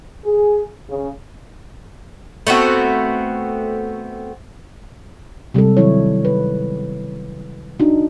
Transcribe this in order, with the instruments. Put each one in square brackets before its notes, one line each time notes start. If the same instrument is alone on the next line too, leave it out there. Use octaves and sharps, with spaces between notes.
[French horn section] G#4
C#3
[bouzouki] A3 B3 C4 F#4
[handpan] C3 G3 G#3 A4
D#3 F#3 E4 C#5
B4
D4 D#4 F#4